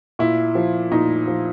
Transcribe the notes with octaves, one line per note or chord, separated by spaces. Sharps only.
A#2 E4
F3
A#2 D#4
F3